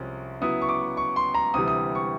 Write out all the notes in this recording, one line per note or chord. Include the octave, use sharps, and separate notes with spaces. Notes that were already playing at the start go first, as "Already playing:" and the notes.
Already playing: C2 C3 F3 G#3 C#4
C#3 F#3 B3 E4 D#6
C#6
D6
C#6
C6
A#5
D2 C3 E3 G3 D#6
D#6
C#6